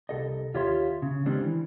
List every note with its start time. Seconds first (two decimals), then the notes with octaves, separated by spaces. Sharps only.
0.09 C2 A4 D#5
0.54 D#2 F4 G4 C#5 E5 C6
1.02 C#3
1.26 D3 D#3 G3 G#3 C4 D4
1.42 E3